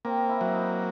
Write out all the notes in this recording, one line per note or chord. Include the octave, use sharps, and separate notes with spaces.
A#3 C4
E4
F#3
D#4